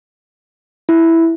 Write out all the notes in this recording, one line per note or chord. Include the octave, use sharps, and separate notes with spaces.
E4